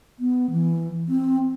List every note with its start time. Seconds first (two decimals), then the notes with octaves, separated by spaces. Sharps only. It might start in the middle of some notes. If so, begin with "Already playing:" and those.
0.19 B3
0.51 E3
1.08 C4